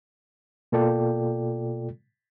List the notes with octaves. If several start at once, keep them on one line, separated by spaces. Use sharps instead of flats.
B2 A#3 F4 A4 D5 G5